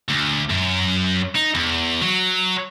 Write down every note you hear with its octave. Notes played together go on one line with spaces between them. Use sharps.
D2
F#2
D#4
E2
F#3